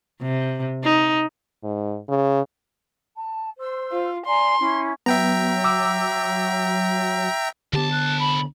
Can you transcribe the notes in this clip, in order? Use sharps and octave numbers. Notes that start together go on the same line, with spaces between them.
C3
D#4
G#2
C#3
A5
C5 C6 E6
F4
D5 G#5 A#5 C6
C#4 E4
F#3 B3 E5 G5 A#5
D6 E6
C2 D3 B3 G4 A5
F#6
B5